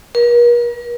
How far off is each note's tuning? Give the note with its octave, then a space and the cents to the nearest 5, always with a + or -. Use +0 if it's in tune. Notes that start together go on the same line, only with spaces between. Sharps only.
A#4 +45